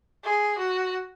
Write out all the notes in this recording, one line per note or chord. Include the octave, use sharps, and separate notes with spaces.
G#4
F#4